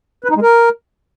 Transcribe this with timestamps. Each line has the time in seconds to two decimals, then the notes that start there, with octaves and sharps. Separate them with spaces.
0.24 B4
0.30 D#4
0.36 G#3
0.42 A#4